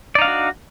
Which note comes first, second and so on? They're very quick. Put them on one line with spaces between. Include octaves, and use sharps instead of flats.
D5 D#4 F5 D4 F#4